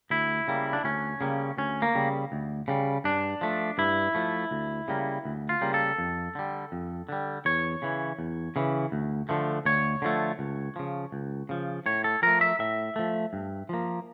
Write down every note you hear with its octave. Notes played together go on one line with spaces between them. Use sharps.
D2 E4
C#3 G3 A#3
D4
D2 C#4
C#3 G3 A#3
D2 C#4
A#3
C#3 G3
D2
C#3 G3
G2 D4
F3 A3
G2 E4
F3 A3
D2
C#3 G3 A#3
D2
F4
C#3 G3 A#3
A4
F2
D3 G3
F2
D3 G3
E2 C#5
C#3 E3
E2
C#3 E3
D2
D3 F3 A3
D2 C#5
D3 F3 A3
C#2
C#3 F3
C#2
C#3 F3
A2 C#5
A4
F3 A3 A#4
E5
A2 E5
F3 A3
G2
F3 A#3